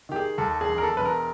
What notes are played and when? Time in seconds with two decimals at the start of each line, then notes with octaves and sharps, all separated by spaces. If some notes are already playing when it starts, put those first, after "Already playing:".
0.09 D#3 G4
0.16 G#4
0.38 D#2 A4
0.61 G#4
0.69 E1
0.78 A#4
0.83 A4
0.97 E1 B4
1.05 A#4